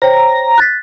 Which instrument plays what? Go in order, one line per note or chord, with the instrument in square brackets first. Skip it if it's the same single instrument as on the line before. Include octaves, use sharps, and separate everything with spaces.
[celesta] C5 C#5 G5 [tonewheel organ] A#5
[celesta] F#6 A6 B6